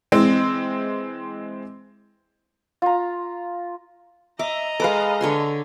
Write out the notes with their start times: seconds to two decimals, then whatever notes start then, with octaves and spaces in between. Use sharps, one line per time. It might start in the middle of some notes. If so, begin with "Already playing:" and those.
0.12 E3 G#3 C4
2.82 F4 A#5
4.39 D#5 E5 A#5 D6
4.80 G#3 A4 B4 F5 D6
5.21 D3 C#5 C6